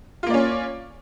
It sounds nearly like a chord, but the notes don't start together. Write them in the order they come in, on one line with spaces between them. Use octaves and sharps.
F4 A#3 D5 C#4